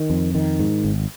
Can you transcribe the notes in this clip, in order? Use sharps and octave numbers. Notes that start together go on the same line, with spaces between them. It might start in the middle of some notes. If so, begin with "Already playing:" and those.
Already playing: D#3
F2
D#3
G#2
G#1